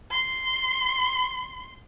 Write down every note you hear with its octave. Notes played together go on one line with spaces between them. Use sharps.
C6